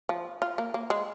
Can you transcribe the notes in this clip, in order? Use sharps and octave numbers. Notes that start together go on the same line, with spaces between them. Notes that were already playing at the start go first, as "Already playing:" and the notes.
F3
F4
A#3
A#3
G#3